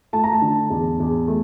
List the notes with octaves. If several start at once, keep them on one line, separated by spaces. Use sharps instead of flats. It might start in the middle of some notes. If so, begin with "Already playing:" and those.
A3 A5
A#5
A5
D3
E2
E2
A3